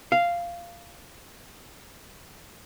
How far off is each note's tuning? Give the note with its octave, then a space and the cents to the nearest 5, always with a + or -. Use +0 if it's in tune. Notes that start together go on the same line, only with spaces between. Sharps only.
F5 -10